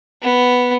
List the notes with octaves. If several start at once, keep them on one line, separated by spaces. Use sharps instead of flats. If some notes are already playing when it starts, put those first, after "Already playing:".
B3